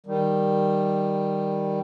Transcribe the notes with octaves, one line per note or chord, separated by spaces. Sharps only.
D#3 G3